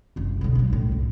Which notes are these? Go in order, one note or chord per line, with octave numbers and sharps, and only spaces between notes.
F#1 C2
B2 D3
F#3 D4
C2 A2
F#2